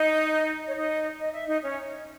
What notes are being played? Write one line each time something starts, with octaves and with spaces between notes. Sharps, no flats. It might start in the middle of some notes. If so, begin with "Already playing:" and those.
Already playing: D#4 D#5
C#5
D#4 D#5
D#5
E5
D#4 D#5
C#4 C#5